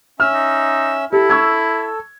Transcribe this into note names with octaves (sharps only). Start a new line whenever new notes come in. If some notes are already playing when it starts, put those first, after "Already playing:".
C#4 E5 E6 F6
D#4
E4 G4 A4
C#6 E6 G#6